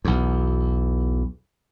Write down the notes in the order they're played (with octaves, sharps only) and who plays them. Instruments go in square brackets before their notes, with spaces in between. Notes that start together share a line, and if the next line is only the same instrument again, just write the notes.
[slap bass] B1 E2